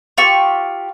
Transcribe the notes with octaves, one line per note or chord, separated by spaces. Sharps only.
F4 G4 C#6 E6